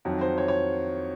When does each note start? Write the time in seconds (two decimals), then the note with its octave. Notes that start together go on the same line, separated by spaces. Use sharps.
0.05 F2 D#3 F#3
0.21 C5
0.38 C#5
0.48 C#5